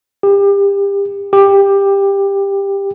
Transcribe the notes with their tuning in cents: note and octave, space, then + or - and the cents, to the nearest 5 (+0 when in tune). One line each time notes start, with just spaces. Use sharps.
G4 +30
G4 +15